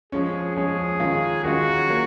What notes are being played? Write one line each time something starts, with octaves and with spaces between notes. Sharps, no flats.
F3 G#3 C#4 G#4
F3 G#3 C#4 G#4
D#3 G#3 C#4 F4
D#3 G#3 C#4 F4 F#4
F#3 A#3